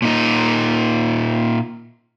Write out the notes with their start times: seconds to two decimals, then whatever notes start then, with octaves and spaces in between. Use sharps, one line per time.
0.02 A#2 D#4